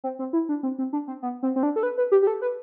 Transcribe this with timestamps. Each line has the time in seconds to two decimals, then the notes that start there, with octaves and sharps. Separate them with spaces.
0.04 C4
0.19 C4
0.33 E4
0.49 D4
0.63 C4
0.79 C4
0.93 D4
1.08 C4
1.22 B3
1.43 C4
1.56 C4
1.63 D4
1.76 A4
1.83 B4
1.98 B4
2.12 G4
2.22 G4
2.27 A4
2.42 B4